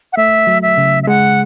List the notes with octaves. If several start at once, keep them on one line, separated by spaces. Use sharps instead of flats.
F#5
A3 E5
F#3
E5
C#3
E5
G#3 F#5